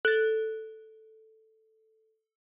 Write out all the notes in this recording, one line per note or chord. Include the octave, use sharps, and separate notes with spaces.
A4 F#6 A6